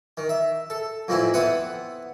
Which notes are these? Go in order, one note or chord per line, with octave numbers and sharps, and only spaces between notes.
D#3
E5
A4
F2 A2 E3 C4 E4
B3 C4 E4 F#5 D#6